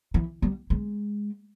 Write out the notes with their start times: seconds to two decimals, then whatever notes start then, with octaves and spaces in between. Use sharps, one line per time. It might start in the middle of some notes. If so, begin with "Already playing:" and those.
0.14 E3
0.42 G3
0.70 G#3